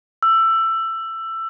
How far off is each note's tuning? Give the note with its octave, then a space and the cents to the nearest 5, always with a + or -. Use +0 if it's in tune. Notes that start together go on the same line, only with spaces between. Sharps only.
E6 +15